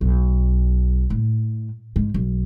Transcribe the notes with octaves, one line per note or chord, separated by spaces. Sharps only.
B1
A2
G#2
B1